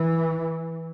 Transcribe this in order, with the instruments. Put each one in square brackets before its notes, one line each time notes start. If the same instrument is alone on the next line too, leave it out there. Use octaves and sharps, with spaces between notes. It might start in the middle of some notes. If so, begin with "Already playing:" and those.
Already playing: [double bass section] E3